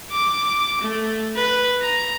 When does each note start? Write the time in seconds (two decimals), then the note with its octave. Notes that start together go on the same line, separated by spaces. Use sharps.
0.12 D6
0.81 A3
1.36 B4
1.82 A#5